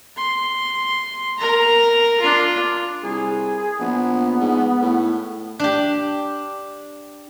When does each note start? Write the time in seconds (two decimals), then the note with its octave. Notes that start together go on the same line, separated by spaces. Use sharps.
0.17 C6
1.38 A#4 A#5
2.20 D4 F4
3.03 C2 G#4
3.79 A#1 B3
4.40 G#2
4.82 A2
5.59 D4 G4